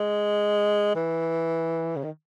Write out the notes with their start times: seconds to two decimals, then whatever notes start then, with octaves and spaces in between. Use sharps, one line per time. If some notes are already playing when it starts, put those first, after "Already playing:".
Already playing: G#3
0.95 E3
1.96 C#3
2.04 D#3